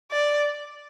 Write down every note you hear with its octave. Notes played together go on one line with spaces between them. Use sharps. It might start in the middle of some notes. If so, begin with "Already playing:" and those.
D5